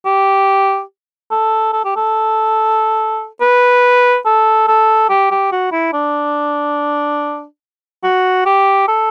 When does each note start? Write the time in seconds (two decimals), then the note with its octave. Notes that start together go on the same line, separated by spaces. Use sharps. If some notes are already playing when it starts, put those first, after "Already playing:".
0.05 G4
1.31 A4
1.73 A4
1.85 G4
1.96 A4
3.41 B4
4.26 A4
4.67 A4
5.10 G4
5.31 G4
5.52 F#4
5.72 E4
5.93 D4
8.03 F#4
8.46 G4
8.88 A4